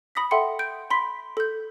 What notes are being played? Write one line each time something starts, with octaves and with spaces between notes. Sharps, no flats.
B5 D#6 A#6 B6
A4 E5 F#5 G5 C6 C#7
G6 D7
B5 C6 B6
A4 G6